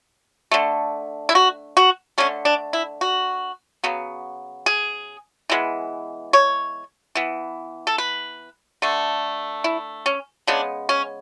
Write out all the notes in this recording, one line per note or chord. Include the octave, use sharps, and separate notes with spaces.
D3 A3
E4
F#4
F#4
D3 A3 C#4
D4
E4
F#4
C#3 F#3 B3
G#4
E3 G#3 B3
C#5
E3 B3
A4
B4
D3 A3
E4
C#4
C#3 G#3 B3 D4
C#4